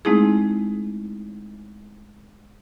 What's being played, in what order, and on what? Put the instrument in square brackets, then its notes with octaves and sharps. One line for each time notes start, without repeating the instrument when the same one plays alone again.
[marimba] G#3 A3 C4 D#4 E4 G#4